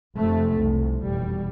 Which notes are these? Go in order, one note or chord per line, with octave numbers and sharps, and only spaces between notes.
F1 F2 C3 A3
C2 C3
F1 E2 B2 G3